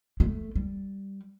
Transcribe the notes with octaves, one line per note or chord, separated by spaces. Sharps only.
G#3 A3
G3